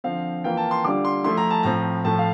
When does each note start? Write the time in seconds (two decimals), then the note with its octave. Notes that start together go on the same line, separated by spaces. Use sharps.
0.04 D3 F3 C4 F5
0.44 E3 A#3 F4 G5
0.57 A5
0.71 C6
0.84 D3 G3 D4 F4 D6
1.05 C6
1.24 F3 A3 E4 C6
1.37 A#5
1.50 A5
1.63 A2 F3 C4 A#5
2.05 A2 F3 A3 A5
2.19 F5